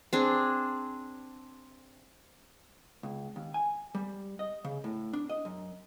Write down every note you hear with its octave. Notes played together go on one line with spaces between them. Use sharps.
C4 D4 G#4
C#2
D#2
G#5
G3
D#5
C#3
A2
D4
D#5
F#2